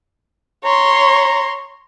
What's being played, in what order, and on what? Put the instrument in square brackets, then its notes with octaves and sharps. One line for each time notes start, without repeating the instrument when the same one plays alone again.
[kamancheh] C#5 C6 [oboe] A#5